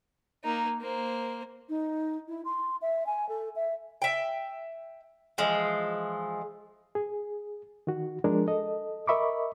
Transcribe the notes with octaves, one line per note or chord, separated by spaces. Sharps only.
A#3 D#4
A#3 C5
D#4
E4
C6
E5
G#5
A4
E5
E5 G5
E3 F3 G#3
G#4
D#3 F#4
F3 G#3 D4 G#4 A#4
A4 D#5
A#4 D#5 E5 B5 C#6 D6